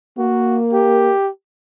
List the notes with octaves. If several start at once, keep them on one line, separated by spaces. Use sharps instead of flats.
A#3 F#4
G4